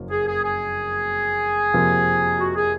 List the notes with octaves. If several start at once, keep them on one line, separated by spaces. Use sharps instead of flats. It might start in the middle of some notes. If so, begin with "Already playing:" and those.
Already playing: F#1 F2 F#3 A#3
G#4
G#4
G#4
F2 C3 F3 A#3 F4
F#4
G#4